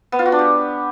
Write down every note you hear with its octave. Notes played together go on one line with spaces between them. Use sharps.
B3
F4
F#4
D4
G4